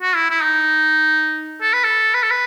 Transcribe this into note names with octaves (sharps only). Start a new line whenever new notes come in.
F#4
E4
E4
D#4
A4
B4
A4
B4
A4
B4